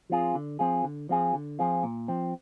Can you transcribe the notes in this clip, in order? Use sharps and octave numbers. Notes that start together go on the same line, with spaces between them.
F3 C4 F4 G#4
D3
F3 C4 F4 G#4
D3
F3 C4 F4 G#4
D3
F3 C4 F4 G#4
A#2
F3 C4